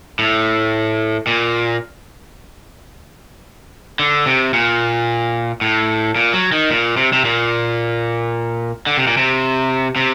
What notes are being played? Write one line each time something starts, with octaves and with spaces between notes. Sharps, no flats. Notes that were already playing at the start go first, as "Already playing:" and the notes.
A2
A#2
D3
C3
A#2
A2
A#2
F#3
D#3
A#2
C3
C3
A#2
D3
C3
A#2
C3
C3